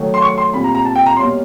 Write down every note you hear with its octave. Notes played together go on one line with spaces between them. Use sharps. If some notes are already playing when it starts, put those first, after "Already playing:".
Already playing: D#3 F#3 A3
C6
C#6
C6
A#2 G3 C4 B5
A#5
A#5
A5
G5
A#5
B2 G3 A#3 C#4 C6